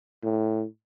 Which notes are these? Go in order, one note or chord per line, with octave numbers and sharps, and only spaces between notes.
A2